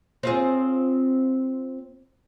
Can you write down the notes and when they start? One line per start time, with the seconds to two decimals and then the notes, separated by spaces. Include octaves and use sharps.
0.23 C4 F4 G#4